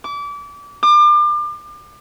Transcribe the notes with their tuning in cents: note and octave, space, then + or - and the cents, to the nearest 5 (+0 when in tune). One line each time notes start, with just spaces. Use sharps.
D6 -30
D6 +35